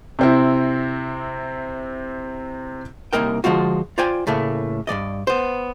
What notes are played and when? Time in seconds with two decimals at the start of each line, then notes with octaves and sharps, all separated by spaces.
0.19 C3 C4 E4
3.13 C2 B2 A#3 D#4 A#4 G5
3.44 D3 F3 G#3 F4 F#4
3.98 F4 C5 D5 G5 G#5
4.27 A2 C#3 A3 A#3
4.87 G2 D#3 D5 D#5
5.27 B3 C5